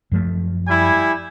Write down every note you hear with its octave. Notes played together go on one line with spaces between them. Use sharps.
F#2 F3 A3
G3 E4 G#5